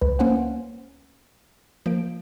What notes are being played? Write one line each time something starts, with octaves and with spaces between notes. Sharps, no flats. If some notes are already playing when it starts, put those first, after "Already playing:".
C#2 B4
A#3 C#4 C5 F#5
F3 A#3 D7